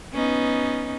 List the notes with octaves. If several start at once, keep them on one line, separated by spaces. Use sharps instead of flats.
B3 C#4 D#4